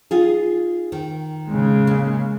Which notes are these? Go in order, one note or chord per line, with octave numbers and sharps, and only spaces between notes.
D#4 F4 G#4
D#3
C#3 G#3
A#3